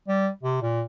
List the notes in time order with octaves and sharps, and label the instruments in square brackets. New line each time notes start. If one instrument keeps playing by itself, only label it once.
[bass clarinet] G3
C3
A#2